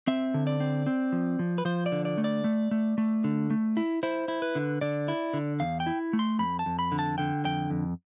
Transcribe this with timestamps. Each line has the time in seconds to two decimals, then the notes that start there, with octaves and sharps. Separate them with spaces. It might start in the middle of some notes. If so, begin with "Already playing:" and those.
0.07 C4 E5
0.34 D3
0.47 D5
0.60 C4
0.86 C4
1.12 F3
1.39 F3
1.58 B4
1.65 F3 C5
1.86 D5
1.92 D3
2.05 D5
2.18 A3
2.24 D5
2.44 A3
2.71 A3
2.98 A3
3.24 D3
3.50 A3
3.77 E4
4.03 E4 C5
4.28 E4
4.42 B4
4.55 D3
4.81 D3 D5
5.08 E4
5.34 D3
5.60 E2 F5
5.80 G5
5.86 E4
6.13 A3
6.19 C6
6.39 F2 B5
6.59 A5
6.66 F2
6.79 B5
6.92 D3
6.99 A5
7.18 D3 G5
7.45 F2 G5
7.70 F2